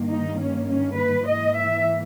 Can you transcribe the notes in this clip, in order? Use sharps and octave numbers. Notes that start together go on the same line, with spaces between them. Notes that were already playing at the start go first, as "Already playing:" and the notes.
Already playing: G2 D#3 A#3
D#4
C#4
C#4
B4
G#2 E3 A#3 D#5
E5